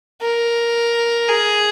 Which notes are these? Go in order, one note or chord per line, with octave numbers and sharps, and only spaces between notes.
A#4
G#4